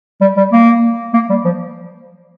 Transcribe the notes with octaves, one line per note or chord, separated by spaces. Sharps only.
G3
G3
A#3
A#3
G3
F3